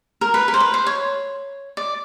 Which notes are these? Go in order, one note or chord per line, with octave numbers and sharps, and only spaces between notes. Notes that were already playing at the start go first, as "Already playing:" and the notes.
A#4
B4
A#4
C5
B4
C5
C#5
D5